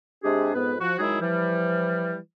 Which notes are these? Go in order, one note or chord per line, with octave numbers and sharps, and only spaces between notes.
C3 G#3 D4 G4 G#4
F2 G#2 B3 B4
F3 F#4
D#3 F#3 G#3 D#4 E4 G#4
E3 F3 G3